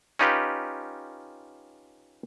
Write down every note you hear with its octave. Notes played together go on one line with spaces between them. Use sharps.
C#4 D#4 F4 G4 B4